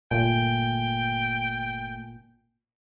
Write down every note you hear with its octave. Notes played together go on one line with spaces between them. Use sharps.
G1 A#2 A3 G5 G#5